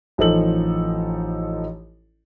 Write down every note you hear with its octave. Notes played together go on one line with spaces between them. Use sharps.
A1 F3 D#4 A4 F#7